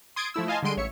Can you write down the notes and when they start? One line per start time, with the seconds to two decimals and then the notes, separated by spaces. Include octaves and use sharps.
0.16 C6 D#6 G#6 A6 C7 D7
0.34 F3 A3 E4 E6
0.48 D#5 F5 G#5 A5 C6
0.63 D3 G3 G#3 C6 D7 D#7
0.77 A1 C#5 E5 C#7